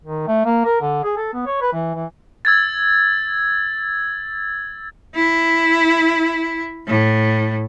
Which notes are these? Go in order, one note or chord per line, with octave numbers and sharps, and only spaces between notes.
D#3
A3
A#3
A#4
D3
G#4
A4
B3
C#5
B4
E3
E3
E6 G#6 A6
E4
A2